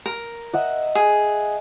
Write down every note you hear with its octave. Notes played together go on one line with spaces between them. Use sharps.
A#4
D#5 E5 F#5
G#4